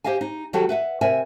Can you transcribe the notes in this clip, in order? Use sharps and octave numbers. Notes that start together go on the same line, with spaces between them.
G4 C5 D#5 F5 G#5
D#4
D#3 F#3 G3 F#4 G4 A4
B4 E5 F#5
C3 A#4 E5 G#5